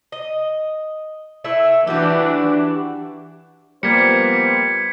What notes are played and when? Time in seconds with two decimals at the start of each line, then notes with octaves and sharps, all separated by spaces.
0.12 D#5
1.44 A3 E4 E5
1.87 E3 D4 F#4 G4
3.83 F3 G3 A#3 B3 C5 G#6 B6 C#7